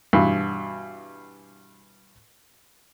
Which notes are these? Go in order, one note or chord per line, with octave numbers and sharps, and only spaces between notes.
G2 B2 E3